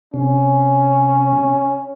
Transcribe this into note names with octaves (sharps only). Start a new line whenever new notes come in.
C3 C#4